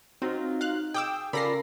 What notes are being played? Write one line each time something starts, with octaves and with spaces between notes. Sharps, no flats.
F#3 C4 D#4 F4
F5 F#6
G#4 G5 D6 E6
C#3 F4 A4 A#4 D5 B5 A#6 C7